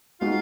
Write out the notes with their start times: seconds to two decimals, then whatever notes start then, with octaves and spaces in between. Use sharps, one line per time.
0.21 G#3 B3 D#4 F4 F#4